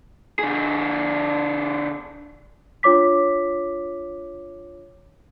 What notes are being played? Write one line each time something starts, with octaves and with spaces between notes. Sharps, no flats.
D3 G#4
D4 F4 C#5 D6 B6